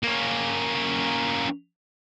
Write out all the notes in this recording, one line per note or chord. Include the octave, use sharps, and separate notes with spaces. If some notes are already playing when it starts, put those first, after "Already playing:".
A#3 C#4